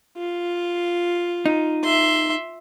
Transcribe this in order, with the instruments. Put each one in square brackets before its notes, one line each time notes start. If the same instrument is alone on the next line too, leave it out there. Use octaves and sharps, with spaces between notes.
[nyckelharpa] F4
[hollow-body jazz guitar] D#4
[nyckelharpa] E5 C6